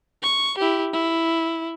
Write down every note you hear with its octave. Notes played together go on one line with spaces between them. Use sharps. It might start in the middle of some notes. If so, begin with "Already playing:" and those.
C#6
E4 G4
E4